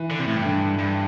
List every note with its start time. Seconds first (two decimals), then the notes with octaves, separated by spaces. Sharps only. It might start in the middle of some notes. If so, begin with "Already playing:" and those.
Already playing: E3
0.11 D3
0.19 C3
0.27 A2
0.36 G2
0.44 D3
0.78 G2